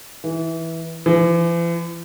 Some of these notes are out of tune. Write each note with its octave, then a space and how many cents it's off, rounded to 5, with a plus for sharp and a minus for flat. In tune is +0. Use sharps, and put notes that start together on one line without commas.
E3 -10
E3 +45